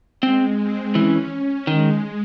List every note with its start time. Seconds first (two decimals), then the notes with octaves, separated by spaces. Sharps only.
0.23 G#3 C4
0.59 C4
0.95 E3 C#4
1.67 D#3 G#3